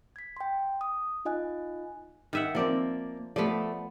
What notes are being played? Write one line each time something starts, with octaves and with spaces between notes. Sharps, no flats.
G#6 B6
G5 C6
D#6
D#4 F4 D#5 G#5 F#6
D#3 E5 F#5
F3 A#3 C4 D5
F3 A3 B3 A4 D5